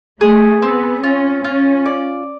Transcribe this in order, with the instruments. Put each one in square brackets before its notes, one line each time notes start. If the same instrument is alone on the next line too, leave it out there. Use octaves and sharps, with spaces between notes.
[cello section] A3 [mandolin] G#4
[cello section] B3 [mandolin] C4
[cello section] C#4 [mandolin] F4
[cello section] C#4 [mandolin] F4
[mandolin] D5